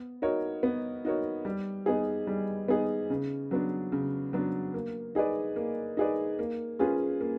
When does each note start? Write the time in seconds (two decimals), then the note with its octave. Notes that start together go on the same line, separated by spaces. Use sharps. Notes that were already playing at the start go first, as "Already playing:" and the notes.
Already playing: B3
0.22 D#4 F#4 A#4 C#5
0.63 B3
1.05 D#4 F#4 A#4 C#5
1.45 G3
1.86 B3 D#4 G#4
2.27 G3
2.68 B3 D#4 G#4
3.10 C#3
3.51 F#3 B3 D4
3.92 C#3
4.33 F#3 B3 D4
4.74 A#3
5.15 D#4 G#4 B4 D5
5.56 A#3
5.97 D#4 G#4 B4 D5
6.39 A#3
6.79 C#4 F4 G#4 B4
7.21 A#3